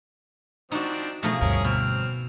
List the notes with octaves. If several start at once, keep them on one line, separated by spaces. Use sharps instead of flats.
F3 C4 D4 D#4 F#4
B2 F3 A3 G#4 A#5
D2 G2 C#4 G#4 A#4
B2 C4 F6